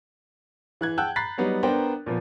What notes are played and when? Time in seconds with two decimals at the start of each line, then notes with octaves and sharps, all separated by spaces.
0.81 E3 F#6 G#6
0.98 F#5 G5 A5 E6 F#6 G6
1.16 A#5 B5 F#6 A6 B6 C7
1.38 F#3 G3 B3 D#4
1.63 B3 D4 A#4 C5 G5 A#5
2.06 A#2 F3 B3